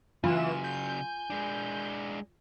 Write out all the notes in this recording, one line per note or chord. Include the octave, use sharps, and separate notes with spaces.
C#3 E3 F#3 F4 G#5 E7
G6
G#3 D4